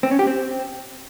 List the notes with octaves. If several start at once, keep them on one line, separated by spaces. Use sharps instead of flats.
C4
C#4
G4
C4